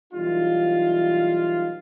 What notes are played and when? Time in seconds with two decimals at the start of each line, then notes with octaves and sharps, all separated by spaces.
0.13 B1 E3 G3 D#4 F4